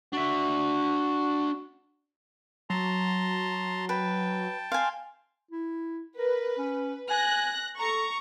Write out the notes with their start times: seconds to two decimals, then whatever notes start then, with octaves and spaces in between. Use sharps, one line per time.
0.13 D4 F#4 E5
2.70 F#3 A5 A#5 C6
3.89 B4 G5 A5
4.72 F5 G#5 C6
5.51 E4
6.17 A#4 B4
6.58 C#4
7.10 G#5 F#6 A#6
7.80 A4 A#5 C#6